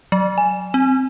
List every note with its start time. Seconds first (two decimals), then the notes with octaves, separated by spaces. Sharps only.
0.12 F#3
0.38 G#5
0.74 C4